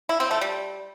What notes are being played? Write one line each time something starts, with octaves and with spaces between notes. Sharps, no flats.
E4
C4
A3
G3